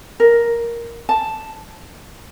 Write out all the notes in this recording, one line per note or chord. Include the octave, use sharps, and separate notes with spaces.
A#4
A5